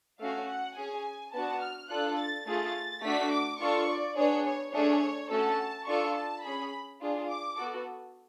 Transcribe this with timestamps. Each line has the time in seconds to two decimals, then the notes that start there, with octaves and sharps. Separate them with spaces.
0.19 A3 C#4 F#4 F5
0.48 F#5
0.76 C#4 G#4 G#5
1.32 B3 D4 F#4 A5
1.61 F6
1.90 D4 F4 A4 F#6
2.17 A6
2.46 A3 F4 G#4 A6
3.03 A3 D4 F#4 B6
3.32 D6
3.60 D4 F4 A4 C#6
3.88 D5
4.17 B3 D4 G#4 C#5
4.45 C#5
4.73 A3 D4 G#4 C#5
5.30 A3 C#4 F#4 A4 A5
5.87 D4 F4 A4 C#6
6.16 A5
6.43 C#4 G#4 B5
7.00 D4 F4 G#4
7.28 D6
7.57 B3 F#4 A4